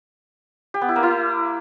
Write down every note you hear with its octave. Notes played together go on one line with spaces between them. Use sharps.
G4
B3
E4
A#3
E4